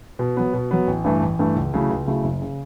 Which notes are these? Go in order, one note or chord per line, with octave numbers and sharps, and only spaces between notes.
B2
F#3 B3
B2
F#3 B3
A1
G2 E3 A3
A1
G2 E3 A3
C#2
C#3 F#3 A3 E4
C#2
C#3 F#3 A3 E4
F#1
C#3